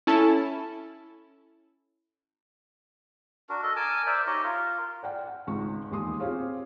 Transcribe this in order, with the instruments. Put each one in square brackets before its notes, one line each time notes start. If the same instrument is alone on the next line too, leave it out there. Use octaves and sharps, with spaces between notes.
[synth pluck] C#4 E4 A4 A5
[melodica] D4 F#4 A#4
A4 D#5
A#4 G#5 A5 D6
A#4 C5 D5 E5
D#4 G4 C#5 D#5
F4 A#4
[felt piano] D5 F#5 G5
F#5
G#1 C#2 C#6
E1 D#2 G#3 G4 C6 D#6
C4 F4 G4 G#4 C#5 F5